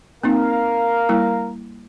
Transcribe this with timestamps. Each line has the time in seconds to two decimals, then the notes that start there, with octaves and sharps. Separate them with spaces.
0.23 A#3 C4 D#4 A#4 F5
1.09 G3 A#3 E4